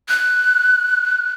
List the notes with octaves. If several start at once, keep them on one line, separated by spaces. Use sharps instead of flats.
F#6